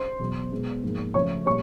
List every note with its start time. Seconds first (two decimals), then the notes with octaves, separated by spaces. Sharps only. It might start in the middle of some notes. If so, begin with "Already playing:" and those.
Already playing: C5 C6
0.19 E2 B2 F#3
0.52 B2 G#3 B3
0.83 G#2 F3 A#3
1.14 C#3 F3 A3 C#5 C#6
1.46 A#2 G3 C#5 C#6